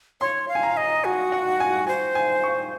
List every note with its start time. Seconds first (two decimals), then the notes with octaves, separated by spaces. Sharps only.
0.21 C#5 C6
0.48 F5
0.55 G#5
0.63 A#5
0.77 D#5
1.05 F#4 G#5
1.32 F#5
1.60 G#5
1.87 C5 G#5
2.15 G#5
2.43 C#6